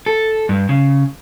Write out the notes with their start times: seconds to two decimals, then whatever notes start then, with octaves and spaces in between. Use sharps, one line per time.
0.06 A4
0.49 G2
0.69 C#3